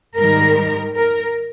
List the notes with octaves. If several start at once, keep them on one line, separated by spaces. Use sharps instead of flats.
G#2 D#3 G3 A#4
A#4